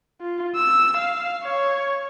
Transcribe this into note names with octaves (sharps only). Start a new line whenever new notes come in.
F4
E6
F5
C#5